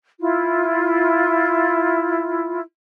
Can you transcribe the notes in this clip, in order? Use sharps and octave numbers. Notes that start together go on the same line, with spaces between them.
E4 F4